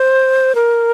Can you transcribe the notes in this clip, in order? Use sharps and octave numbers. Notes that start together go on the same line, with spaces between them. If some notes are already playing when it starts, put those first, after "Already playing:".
Already playing: C5
A#4